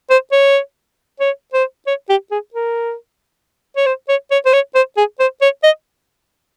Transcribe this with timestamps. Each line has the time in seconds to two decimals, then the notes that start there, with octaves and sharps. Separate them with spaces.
0.10 C5
0.32 C#5
1.20 C#5
1.53 C5
1.87 C#5
2.09 G4
2.31 G#4
2.54 A#4
3.76 C#5
3.86 C5
4.09 C#5
4.31 C#5
4.46 C5
4.53 C#5
4.75 C5
4.97 G#4
5.20 C5
5.42 C#5
5.63 D#5